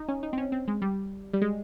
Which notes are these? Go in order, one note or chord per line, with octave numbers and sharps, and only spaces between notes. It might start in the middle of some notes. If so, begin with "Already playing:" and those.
Already playing: D#4
C#4
D#4
C4
C#4
C4
G#3
G3
G3
G#3